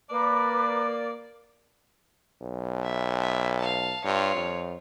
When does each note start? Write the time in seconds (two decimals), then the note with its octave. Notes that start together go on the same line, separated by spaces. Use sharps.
0.10 A#3 A#4 B4 D5 D6
2.41 B1
2.83 E5
3.20 G#4 E5
3.58 F5 A5
4.04 G2 F4 C#5
4.36 F2